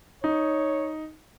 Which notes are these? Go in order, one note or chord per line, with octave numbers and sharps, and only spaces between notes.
D#4 C#5